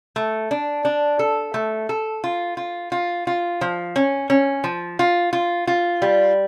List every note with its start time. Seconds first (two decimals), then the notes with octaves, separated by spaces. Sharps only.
0.16 A3
0.51 D4
0.85 D4
1.19 A4
1.54 A3
1.89 A4
2.24 F4
2.57 F4
2.92 F4
3.27 F4
3.61 F3
3.96 C#4
4.30 C#4
4.64 F3
4.99 F4
5.33 F4
5.67 F4
6.02 G3